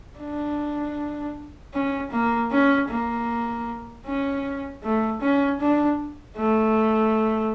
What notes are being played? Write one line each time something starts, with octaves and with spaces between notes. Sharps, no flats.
D4
C#4
A#3
C#4
A#3
C#4
A3
C#4
D4
A3